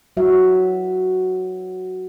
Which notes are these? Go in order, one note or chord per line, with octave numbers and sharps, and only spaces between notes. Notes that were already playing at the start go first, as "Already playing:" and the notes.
F#3 F#4 E5